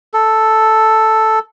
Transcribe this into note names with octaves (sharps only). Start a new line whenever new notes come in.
A4